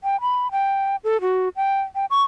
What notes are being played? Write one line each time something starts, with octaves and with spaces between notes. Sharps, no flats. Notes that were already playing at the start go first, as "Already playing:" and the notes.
G5
B5
G5
A4
F#4
G5
G5
C#6